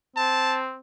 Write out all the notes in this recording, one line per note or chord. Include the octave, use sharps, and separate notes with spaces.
C4 A5